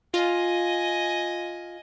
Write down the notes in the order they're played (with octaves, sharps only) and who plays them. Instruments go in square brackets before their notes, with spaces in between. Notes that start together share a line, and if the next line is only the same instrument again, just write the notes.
[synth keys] F4 [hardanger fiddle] D#5 G#5